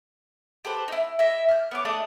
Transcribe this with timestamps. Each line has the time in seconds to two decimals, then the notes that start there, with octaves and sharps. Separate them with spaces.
0.65 G4 A4 B4 C5
0.88 D#4 E4
1.19 E4 D#5 E5
1.49 F6 G6
1.71 B3 C#5 D6
1.85 A3 D4 D#5 D#6